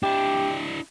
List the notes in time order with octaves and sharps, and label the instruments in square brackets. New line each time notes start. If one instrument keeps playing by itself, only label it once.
[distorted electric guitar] D4 E4 [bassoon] G4